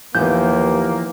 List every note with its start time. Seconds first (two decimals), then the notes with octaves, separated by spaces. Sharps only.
0.15 D#2 E3 F3 A#3 B3 G6